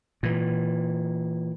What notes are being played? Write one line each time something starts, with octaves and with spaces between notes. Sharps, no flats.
A#2 E3